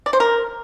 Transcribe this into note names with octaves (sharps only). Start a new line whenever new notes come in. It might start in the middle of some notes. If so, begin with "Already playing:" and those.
D5
C5
A#4